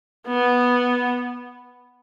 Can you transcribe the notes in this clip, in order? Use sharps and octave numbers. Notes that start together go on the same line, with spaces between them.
B3